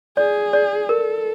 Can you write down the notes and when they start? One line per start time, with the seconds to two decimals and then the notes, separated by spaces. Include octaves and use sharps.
0.17 G#4 D5
0.53 D5
0.89 A4 A#4